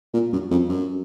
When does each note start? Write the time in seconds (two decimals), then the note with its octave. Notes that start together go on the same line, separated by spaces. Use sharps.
0.14 A#2
0.33 F#2
0.51 F2
0.69 F#2